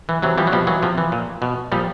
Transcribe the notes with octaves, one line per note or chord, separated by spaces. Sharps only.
E3
C3 E3 F#3
E3 F3 G3
F#3
B2 F3 G3
E3 F#3
C3 F3
E3
A#2
B2
A#2 F3 G3